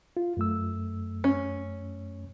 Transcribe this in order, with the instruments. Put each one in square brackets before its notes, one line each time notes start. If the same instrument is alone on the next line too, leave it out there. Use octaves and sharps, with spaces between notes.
[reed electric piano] F4
F#2 A3 E6
[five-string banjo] C#4